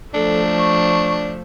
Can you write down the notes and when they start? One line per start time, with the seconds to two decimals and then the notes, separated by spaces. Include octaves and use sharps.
0.14 F3 A3 D4 A4
0.58 C#6